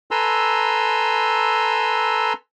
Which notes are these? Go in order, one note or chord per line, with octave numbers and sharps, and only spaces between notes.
A4 B4 G#5 A#5 C6 E6